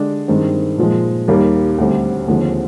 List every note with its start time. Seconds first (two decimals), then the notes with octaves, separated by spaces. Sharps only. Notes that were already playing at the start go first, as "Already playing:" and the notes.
Already playing: D3 G#3 D4 G4
0.28 G2 D#3 G#3 C4
0.78 A#2 F3 G#3
1.28 D#2 D#3 G3 A#3
1.78 D2 D3 G3 C4
2.28 D#2 D3 F3 G#3 C4